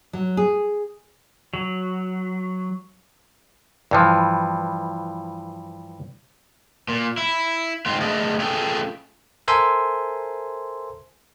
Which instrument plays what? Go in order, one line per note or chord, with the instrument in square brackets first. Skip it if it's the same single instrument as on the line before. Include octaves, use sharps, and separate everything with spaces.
[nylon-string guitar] F#3
G#4
[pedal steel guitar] F#3
[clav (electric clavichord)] G2 E3 F3
[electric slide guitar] A#2
E4
G#2 C4 F4
A3 D4 G#4 D5 D#5
A3 C#4 F4 G#4 A4 G5
[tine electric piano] A4 A#4 C5 E5 G#5 C6